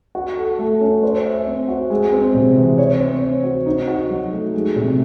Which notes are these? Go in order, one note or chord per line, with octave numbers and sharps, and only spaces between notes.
F#4
A4
A3
C#4
C5
E5
C4
F#4
G#3
C4
C3
E3
C#5
C4
C4
F#4
D#4
F#4
F#3
A3
G#3
C3